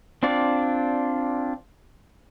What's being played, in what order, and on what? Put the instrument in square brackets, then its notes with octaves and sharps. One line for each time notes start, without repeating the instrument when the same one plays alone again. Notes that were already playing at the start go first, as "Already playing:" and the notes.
[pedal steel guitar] C4 D4 F4 D5